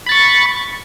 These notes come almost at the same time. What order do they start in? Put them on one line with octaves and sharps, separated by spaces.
B5 A6 C#6